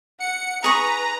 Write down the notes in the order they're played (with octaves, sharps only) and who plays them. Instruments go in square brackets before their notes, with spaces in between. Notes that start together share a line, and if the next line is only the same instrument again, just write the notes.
[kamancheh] F#5 [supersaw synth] C#7
[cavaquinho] D#4 G#4 C#6 [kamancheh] B4 [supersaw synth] A#5